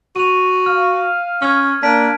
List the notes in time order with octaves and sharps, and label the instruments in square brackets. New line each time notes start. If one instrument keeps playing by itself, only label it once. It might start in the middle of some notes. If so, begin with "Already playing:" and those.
[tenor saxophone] F#4 [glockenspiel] D#7 F7
[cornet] F5 [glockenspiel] F6
[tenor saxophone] C#4 [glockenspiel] F6 G#6
[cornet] A#3 [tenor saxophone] D4 [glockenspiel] A5 B6 D7